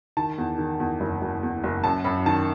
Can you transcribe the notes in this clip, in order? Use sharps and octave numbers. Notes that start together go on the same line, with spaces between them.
D#3 A5
E2
D#3
E2
F#1
F#1
E2
F#1
F#2 A5
F#2 B5
D#3 A5